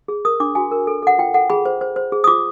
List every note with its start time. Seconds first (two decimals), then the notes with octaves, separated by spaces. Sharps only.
0.08 G#4
0.25 A#4 D#6
0.40 D4 D6
0.55 F#4 G#5
0.71 A#4
0.87 A4
1.03 A4 F#5
1.19 F4 G5
1.34 A4 F#5
1.50 G#4 B5
1.65 C5
1.81 C5
1.96 C5
2.12 G#4
2.24 D#6
2.27 F4 D6